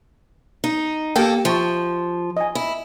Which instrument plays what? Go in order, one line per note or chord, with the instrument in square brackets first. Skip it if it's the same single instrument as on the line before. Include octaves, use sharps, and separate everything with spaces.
[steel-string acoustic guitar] D#4
[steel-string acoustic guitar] A#3 A4 [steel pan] G4 G5
[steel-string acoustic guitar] F3 [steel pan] E5 A5 C#6
[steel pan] D#5 G#5
[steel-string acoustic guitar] E4